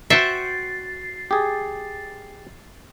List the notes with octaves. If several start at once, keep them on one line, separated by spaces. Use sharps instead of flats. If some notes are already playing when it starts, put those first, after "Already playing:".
F#4 C5 E5 G5 C#6 A6 C7
G4 G#4